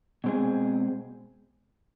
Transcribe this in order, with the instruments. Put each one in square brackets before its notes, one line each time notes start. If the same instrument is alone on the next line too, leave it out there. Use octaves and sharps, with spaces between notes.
[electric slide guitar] B2 G#3 C4 G#4